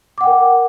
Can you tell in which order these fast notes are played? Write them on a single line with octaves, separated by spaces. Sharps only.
D6 F#5 G5 A#4